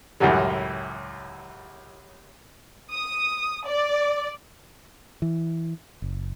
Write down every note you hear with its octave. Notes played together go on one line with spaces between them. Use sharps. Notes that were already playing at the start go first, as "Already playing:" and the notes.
C#2 F#2 A2 E3 F#3 G3
D#6
D5
E3
F#1